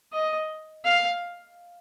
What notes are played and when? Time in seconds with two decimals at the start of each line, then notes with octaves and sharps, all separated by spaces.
0.13 D#5
0.85 F5